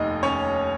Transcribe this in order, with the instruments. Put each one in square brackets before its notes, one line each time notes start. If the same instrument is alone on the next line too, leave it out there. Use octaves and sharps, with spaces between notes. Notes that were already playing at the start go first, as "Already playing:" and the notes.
Already playing: [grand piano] F1 D#2 D#4 D#5
C#4 C#5